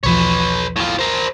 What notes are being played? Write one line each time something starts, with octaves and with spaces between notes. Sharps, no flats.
B1 E2 F3 B4 C#5
A2 F4
A#4 C5